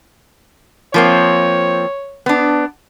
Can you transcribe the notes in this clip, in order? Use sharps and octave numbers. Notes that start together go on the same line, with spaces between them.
F3 A#3 C4 C#5
B3 D4